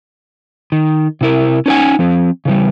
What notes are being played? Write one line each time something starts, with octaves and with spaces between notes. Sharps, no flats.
D#3
C3 E4 A#4
C#4 D#4 B4 F#5 G#5
F3 C4
C#3 E3 G3